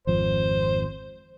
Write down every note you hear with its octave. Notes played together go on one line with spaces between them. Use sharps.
G#1 F2 F3 C5